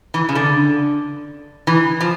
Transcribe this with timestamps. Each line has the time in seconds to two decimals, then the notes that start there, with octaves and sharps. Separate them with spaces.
0.14 E3
0.29 C#3
0.35 D3
1.67 E3
2.01 F3